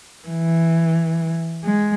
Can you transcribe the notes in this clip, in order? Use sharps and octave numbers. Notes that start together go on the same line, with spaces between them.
E3
G#3